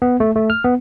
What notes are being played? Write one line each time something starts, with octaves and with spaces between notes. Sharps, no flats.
B3
A3
A3
F6
B3